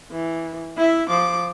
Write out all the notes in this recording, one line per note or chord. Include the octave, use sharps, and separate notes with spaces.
E3
E4 E5
F3 D6